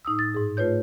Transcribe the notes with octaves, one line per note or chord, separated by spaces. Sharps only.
A2 D#4 D#6 E6
A6
G#2 G#4
A3 F4 B4 C#5 G6